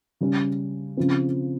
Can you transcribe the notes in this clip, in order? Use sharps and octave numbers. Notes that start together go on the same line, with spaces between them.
C#3 G3 C#4
C#3 F3 C4